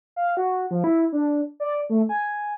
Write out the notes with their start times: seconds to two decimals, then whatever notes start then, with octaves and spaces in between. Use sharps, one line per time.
0.16 F5
0.37 F#4
0.71 F3
0.84 E4
1.12 D4
1.60 D5
1.90 A3
2.09 G#5